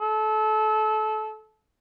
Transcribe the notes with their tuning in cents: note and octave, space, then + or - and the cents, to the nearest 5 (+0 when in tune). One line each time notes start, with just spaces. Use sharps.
A4 -25